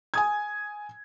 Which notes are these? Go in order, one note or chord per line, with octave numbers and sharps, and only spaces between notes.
G#5 D#6 G#6